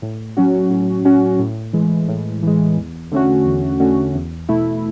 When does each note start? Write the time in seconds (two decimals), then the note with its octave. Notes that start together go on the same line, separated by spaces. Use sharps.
0.02 A2
0.37 F#3 C#4 F#4
0.70 A2
1.05 F#3 C#4 F#4
1.39 A2
1.73 E3 G#3
2.08 A2
2.43 E3 G#3
2.77 E2
3.12 D3 A3 C#4 F#4
3.46 E2
3.80 D3 A3 C#4 F#4
4.15 E2
4.49 B2 A3 E4